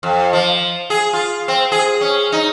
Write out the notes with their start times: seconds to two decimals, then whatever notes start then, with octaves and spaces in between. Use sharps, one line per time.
0.03 F2
0.33 F3
0.90 G#4
1.13 F4
1.48 C4
1.72 G#4
2.01 C#4
2.32 D#4